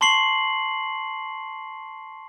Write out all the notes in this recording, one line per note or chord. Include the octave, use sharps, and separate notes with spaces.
A5 C6 C#6 C7 F#7